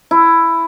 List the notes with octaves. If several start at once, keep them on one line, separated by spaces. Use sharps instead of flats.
E4